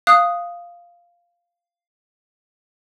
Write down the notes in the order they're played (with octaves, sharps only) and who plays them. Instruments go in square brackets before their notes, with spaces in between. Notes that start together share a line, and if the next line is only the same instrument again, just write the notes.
[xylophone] F5 D#6 F#6